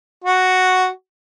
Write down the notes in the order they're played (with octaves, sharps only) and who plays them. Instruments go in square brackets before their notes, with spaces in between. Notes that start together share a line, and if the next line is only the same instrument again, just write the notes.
[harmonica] F#4